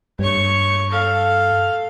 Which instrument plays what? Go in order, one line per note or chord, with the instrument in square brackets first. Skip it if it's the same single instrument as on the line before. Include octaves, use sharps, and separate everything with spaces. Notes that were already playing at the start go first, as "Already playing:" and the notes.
[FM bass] G2 [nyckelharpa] C#5 C#6
[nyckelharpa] A4 F5